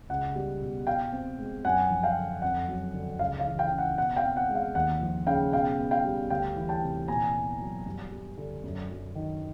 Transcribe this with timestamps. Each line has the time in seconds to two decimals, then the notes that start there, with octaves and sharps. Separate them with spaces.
0.09 C#2 F#5
0.35 G3
0.61 B2
0.87 B2 F5 G5
1.12 C4
1.38 G#3
1.65 F#2 F#5 G#5
1.90 F3
2.03 F5 G5
2.17 D3
2.42 F2 F#5
2.68 F#3
2.93 D3
3.19 C#2 F5
3.39 F5
3.46 E3
3.59 F5 G5
3.71 C#3
3.78 F#5
3.98 B2 F#5
4.16 F5 G5
4.24 C4
4.37 F#5
4.49 G#3
4.55 F5
4.75 D#2 F#5
5.01 F3
5.27 C#3 F5 G5
5.52 B2 F5 G5
5.78 B3
5.91 F5 G5
6.05 G3
6.30 D2 F5 G5
6.56 E3
6.69 G5 A5
6.82 C3
7.08 A#2 G#5 A#5
7.34 B3
7.60 F#3
7.86 G2
8.12 G3
8.37 D3
8.64 F#2
8.90 F#3
9.15 D#3